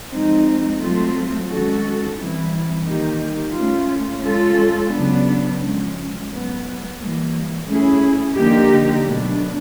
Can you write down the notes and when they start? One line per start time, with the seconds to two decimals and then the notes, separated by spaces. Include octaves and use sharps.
0.11 F3 G#3 C4 D#4
0.80 F#3 A3 C4 F4
1.48 D#3 G#3 C#4 F#4 A4
2.18 E3 G3 C4 E4
2.87 D#3 G3 A#3 D#4 G4
3.55 A3 C#4 F4
4.24 G#3 C#4 F4 A4
4.93 C#3 F#3 B3 D4
5.61 F3 G#3 C#4
6.30 A2 F#3 B3
6.99 E3 G3 A#3
7.68 A3 C#4 E4 G#4
8.37 D3 F3 A#3 D#4 G4
9.05 B2 F#3 A3 D4